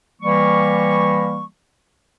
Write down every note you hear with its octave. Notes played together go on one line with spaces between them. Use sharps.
E3 G3 A#3 C#6